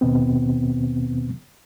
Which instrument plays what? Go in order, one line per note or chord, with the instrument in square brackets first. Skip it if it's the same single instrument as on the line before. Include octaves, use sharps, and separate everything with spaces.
[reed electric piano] D#2 B2 D#3 B3 C4